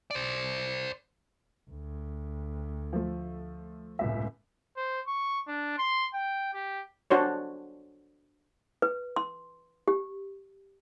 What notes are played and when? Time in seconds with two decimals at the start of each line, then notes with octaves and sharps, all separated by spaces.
0.11 C5 D5
1.70 D2
2.93 F3 A3
3.99 G1 C#2 A2 C3 E5
4.77 C5
5.07 C#6
5.47 D4
5.78 C6
6.14 G5
6.54 G4
7.11 D4 F#4 C5 C#5
8.82 B4
9.16 C6
9.88 G4